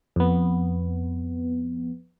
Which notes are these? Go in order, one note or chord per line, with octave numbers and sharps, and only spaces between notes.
F2 B3